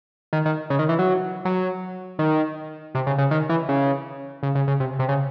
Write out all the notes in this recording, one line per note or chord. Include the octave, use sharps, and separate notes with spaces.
D#3
D#3
C#3
D#3
E3
F#3
F#3
D#3
C3
C#3
C#3
D#3
E3
C#3
C#3
C#3
C#3
C3
C3
C#3